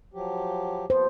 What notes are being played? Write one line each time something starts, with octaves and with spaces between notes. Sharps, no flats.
F3 F#3 G4
D#2 F3 B3 C5